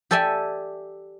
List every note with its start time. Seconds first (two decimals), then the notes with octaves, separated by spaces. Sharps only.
0.11 G4 A4 D5 E5 G#5